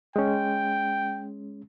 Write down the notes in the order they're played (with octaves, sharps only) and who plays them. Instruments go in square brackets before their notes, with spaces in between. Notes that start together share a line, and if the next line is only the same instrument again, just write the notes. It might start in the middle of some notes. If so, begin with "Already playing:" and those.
[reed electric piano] G#3 C#4 [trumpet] G5